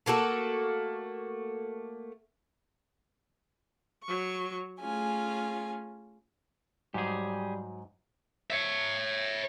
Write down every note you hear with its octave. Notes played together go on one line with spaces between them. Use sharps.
A3 A#3 F#4 A4
F#3 C#6
A3 C#4 F4 G#4 G#5
G#2 F#3 G3 G4 G#4
C#5 E5